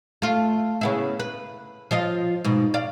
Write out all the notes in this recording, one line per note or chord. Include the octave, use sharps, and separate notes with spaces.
A3 F4
C#3 B3 E4
B4
F3 F4 D#5
G#2 B2
D5 F5